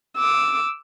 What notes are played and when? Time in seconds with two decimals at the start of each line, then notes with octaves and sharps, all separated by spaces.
0.17 D6 E6